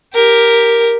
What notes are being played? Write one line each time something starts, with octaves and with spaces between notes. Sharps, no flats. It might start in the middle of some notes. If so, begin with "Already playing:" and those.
G4 A#4